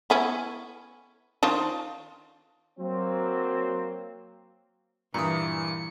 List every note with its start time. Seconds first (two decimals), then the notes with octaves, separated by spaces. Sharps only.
0.10 B3 C#4 E4
1.43 D#3 F3 D4
2.79 F#3 A#3 C4
5.14 G2 A#2 E3 A#5 D#6 C#7